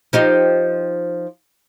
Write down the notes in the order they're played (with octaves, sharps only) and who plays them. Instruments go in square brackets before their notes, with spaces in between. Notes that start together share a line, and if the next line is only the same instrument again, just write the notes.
[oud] F3 D#4 G4